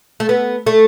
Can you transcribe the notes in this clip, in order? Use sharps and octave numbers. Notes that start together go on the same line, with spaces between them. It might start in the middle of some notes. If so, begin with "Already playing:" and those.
A3
B3
A3